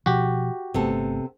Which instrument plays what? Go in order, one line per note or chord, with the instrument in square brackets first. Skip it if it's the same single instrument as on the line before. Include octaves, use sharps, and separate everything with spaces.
[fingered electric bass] B2 F3 [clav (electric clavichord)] F#4 G4
[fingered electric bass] G1 A3 [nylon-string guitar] C3 B3 A4